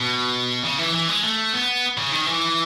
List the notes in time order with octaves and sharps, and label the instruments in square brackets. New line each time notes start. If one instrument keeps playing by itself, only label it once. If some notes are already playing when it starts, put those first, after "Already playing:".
Already playing: [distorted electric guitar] B2
C#3
E3
E3
G#3
A3
B3
C#3
D#3
E3